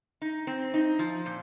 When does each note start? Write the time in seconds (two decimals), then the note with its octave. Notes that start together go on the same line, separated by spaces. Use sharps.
0.22 D#4
0.47 C4
0.74 D#4
0.99 F3
1.26 A#2